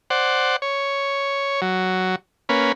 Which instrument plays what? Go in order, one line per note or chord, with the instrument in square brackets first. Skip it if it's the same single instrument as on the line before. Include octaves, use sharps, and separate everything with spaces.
[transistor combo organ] C5 D5 F#5
C#5
F#3
A#3 C#4 B4